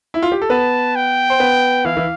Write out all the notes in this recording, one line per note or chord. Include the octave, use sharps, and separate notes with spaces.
E4
F4
G4
A4
B3 B4 A5
G5
C5
B3 B4
E3 E4 F5
E3 E4